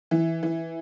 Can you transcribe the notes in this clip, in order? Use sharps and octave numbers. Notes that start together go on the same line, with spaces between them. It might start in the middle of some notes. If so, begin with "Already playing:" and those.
E3
E3